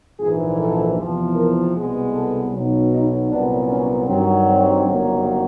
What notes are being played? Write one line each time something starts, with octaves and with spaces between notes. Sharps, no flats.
A#1 G#2 E3 G#4
A4
E2 C3 F3
A#4
C2 B2 G#3 B3
A4
B1 B2 F#3
D#4
C2 A#2 F#3 B3 D4
C#4
G2 D#3 F#3 C4
C4
G1 F#2 D#3 F#3 A#3